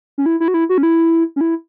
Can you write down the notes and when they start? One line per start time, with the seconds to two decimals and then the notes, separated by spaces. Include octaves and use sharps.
0.18 C#4
0.26 E4
0.40 E4
0.48 F#4
0.54 E4
0.69 F#4
0.78 C#4
0.83 E4
1.36 C#4
1.41 E4